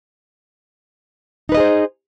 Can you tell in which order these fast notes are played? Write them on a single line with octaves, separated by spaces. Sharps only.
D#4 B4 D#5 G#4 C5